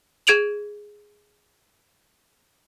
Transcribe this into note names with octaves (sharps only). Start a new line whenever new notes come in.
G#4 G#6 D7 F7 F#7